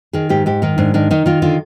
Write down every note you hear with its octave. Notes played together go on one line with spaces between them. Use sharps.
D#3 G#4
G#2 G4
G#2 G4
D#3 D#4
G#2 D4
D#3 D4
D#3 D#4
D#3 F4
D3 F4